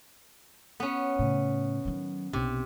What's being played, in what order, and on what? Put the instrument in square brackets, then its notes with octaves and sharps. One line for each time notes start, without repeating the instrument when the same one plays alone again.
[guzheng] B3 C#4
[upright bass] A2 C#3
D#3 F#3
[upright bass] B1 [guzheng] C3